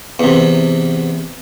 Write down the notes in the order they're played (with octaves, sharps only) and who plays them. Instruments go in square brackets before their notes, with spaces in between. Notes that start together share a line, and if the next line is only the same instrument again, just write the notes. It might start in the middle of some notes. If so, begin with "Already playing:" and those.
[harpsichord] E2 C3